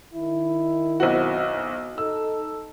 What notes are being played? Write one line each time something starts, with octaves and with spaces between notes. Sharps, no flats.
D#3 E4
B1 C4 F#4
D#4 A4 E6